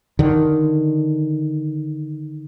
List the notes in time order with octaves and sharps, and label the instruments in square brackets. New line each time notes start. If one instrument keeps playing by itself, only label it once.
[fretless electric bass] D3 D#3